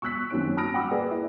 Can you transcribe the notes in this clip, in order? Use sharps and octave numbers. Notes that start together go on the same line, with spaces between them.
C#6 E6 F#6 B6
F#2 D#3 A#3 C4 C#4 D7
A5 B5 D#6 F6 A#6 D7
F#5 G5 B5 D6 E6
A#3 G#4 B4 D5
E4